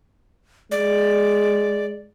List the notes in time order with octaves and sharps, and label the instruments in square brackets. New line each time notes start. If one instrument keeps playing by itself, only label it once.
[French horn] G#3 [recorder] D5